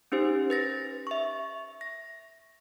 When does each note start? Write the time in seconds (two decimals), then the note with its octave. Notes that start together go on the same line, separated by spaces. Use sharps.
0.12 C#4 D#4 G4 C5
0.50 B4 A6 A#6
1.07 E5 C#6
1.81 A#6